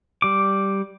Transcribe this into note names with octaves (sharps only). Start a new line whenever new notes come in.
G3 D6